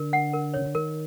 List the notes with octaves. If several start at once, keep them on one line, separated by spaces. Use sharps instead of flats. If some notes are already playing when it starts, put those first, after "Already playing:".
Already playing: D3 A#4
F#5
A#4
C#3 C#5
D3
D#3 A#4